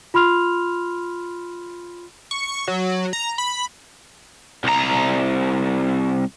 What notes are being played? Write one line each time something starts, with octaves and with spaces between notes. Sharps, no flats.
F4 B5 C6 F6 F7
C#6
F#3
A#5
B5
C2 A#5